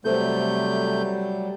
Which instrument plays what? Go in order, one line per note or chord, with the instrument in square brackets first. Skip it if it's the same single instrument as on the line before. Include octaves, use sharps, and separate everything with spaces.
[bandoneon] C3 A3 G6 [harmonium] F#3 G3 [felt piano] A4 C5